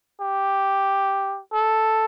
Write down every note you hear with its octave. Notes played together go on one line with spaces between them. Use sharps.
G4
A4